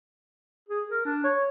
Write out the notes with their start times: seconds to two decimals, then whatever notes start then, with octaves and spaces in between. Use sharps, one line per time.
0.69 G#4
0.91 A#4
1.05 D4
1.24 C#5